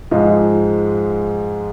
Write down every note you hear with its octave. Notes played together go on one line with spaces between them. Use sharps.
G#2 F3 G#3